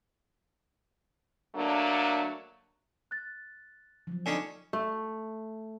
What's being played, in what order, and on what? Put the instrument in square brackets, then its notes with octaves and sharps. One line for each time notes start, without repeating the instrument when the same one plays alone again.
[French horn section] D3 F#3 A3 A#3 D4
[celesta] F#6 A6
[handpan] F3 F#3
[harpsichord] D3 C#4 D#4 [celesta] G#5
[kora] A3